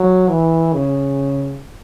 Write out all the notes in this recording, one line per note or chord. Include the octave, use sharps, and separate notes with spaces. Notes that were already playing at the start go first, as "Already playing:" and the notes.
Already playing: F#3
E3
C#3